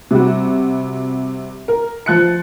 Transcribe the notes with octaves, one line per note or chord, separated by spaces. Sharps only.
C3 G3 F#4
A#4
F3 F#6 C#7